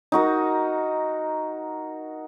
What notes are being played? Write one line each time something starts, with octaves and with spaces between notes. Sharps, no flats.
D#4 F#4 A#4